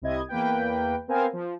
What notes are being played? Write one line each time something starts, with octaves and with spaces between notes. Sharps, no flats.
C2 C3 E4 D#5 G#6
E2 A#3 B4 G5
B3 C4 A#4 C5 F5 G#5
F3